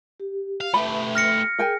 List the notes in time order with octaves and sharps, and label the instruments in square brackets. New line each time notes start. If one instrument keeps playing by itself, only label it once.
[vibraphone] G4
[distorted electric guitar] F5
[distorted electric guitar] A3 G4 [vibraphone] B4 E5 [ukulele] B5
[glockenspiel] F6 A#6 C#7
[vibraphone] G#4 [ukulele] A#4 G5 G#5